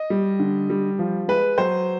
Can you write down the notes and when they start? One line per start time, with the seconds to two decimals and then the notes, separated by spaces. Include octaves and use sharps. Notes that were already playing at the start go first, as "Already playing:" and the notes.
Already playing: D#5
0.10 G3
0.39 D3
0.70 G3
0.99 F3
1.28 G#3 B4
1.58 F#3 C5